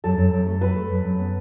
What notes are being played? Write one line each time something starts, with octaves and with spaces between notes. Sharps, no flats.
F#2 A4
F#2
F#2
A3
F#2 B4
A3
F#2
F#2
B3